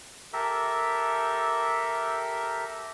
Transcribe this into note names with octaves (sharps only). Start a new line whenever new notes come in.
G4 A4 A#4 E5